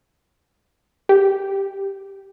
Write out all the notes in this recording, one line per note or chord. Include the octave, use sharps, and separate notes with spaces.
G4